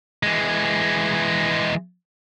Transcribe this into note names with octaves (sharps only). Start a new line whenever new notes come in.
E3 G#3